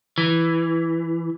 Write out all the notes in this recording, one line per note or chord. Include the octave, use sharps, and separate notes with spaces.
E3